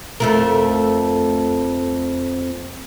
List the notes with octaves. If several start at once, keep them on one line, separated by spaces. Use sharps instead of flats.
F2 A3 A#4